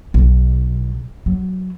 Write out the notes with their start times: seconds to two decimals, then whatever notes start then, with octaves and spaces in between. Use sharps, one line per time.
0.14 B1
1.26 F#3